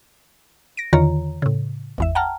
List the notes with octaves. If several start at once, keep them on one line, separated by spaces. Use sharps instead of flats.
A#6 D7
E2 D3 D#3 F4 C#5 A#5
A2 C#3
G#1 E2 E5
F#5 G5 A5 A#5 F6